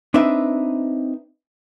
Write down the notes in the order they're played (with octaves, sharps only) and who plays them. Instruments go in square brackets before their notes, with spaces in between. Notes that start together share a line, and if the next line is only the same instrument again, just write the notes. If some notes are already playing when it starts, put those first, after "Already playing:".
[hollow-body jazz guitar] C4 D4 D#4 B4 E5